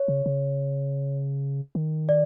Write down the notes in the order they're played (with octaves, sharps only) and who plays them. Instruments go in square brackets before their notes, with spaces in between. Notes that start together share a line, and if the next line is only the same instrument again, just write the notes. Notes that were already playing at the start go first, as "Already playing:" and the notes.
Already playing: [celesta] C#5
[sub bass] C#3
C#3
D#3
[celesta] D5